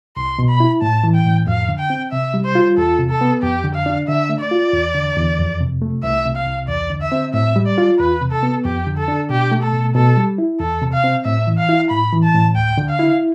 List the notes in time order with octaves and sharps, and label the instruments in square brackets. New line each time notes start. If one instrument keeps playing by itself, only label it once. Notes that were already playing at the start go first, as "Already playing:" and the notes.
[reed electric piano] C2 [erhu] C6
[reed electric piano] B2
[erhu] B5
[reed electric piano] E4
[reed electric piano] A2 [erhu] A5
[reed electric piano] E3
[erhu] G5
[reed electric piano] A2
[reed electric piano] F2 [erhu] F5
[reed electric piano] D3
[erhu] G5
[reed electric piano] C4
[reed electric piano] C3 [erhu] E5
[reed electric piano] G3
[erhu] C5
[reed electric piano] F4
[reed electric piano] E2 [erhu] A4
[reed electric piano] C3
[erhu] A4
[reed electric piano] B3
[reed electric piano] F2 [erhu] G4
[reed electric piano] D3
[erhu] F5
[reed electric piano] D4
[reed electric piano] D3 [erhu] E5
[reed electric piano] A3
[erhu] D5
[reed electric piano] F4
E2
D3
E2
F2
C3
A3
[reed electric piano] C2 [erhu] E5
[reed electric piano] C3
[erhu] F5
[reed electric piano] C2
[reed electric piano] E2 [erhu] D5
[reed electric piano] D3
[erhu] E5
[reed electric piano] C4
[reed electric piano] A2 [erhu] E5
[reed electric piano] G3
[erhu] D5
[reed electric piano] F4
[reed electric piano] E2 [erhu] B4
[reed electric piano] C3
[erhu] A4
[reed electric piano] B3
[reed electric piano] F2 [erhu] G4
[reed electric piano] D3
[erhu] A4
[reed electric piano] D4
[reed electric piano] B2 [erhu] G4
[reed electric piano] A3
[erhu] A4
[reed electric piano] B2
[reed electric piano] B2 [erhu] A4
[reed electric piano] G3
E4
[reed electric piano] E2 [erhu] A4
[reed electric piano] C3
[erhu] F5
[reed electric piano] C4
[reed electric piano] A2 [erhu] E5
[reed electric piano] E3
[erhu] F5
[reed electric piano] E4
[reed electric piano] A2 [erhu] B5
[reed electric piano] E3
[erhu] A5
[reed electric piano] A2
[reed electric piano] D2 [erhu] G5
[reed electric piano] D3
[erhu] F5
[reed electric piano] E4